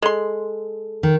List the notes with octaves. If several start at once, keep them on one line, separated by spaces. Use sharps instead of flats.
G#3 A4 C6
D#3